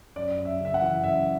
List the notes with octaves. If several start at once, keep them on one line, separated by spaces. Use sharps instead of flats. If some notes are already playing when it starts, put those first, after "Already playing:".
F#2 D5
F#2
E5
C#3 E5
F#5
E3
F#2 E5